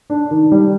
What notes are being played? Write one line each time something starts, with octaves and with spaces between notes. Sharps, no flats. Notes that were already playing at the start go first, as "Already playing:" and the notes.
D4
D#3
G3